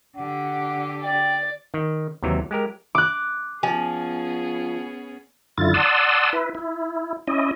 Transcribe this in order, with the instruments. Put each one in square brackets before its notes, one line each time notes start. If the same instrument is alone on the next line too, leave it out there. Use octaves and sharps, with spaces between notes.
[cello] D3 G4 [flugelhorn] F#5
[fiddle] D5 [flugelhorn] G5
[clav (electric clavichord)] D#3
D#2 C3 E3 F#3 A#5
G#3 G4 A#4
[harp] D6 F#6
[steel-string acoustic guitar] F3 [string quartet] B3 C#4 G#4 [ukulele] G#5
[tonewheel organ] F#2 D3 E4 F4 A6
D5 F#5 A5 C6 D#6 E6
E4 B4
E4
C#4 E4 D#5